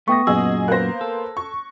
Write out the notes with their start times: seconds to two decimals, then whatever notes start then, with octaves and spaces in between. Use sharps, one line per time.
0.08 A3 B3 G5 C#6 D#6 A#6
0.27 F#2 A#2 F#4 G#4 D#5 G#5 E6
0.68 A#3 B3 C5 F#6 A#6
1.01 A4
1.37 C#6